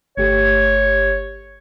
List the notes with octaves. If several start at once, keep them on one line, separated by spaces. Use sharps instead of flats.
G1 A3 G4 C#5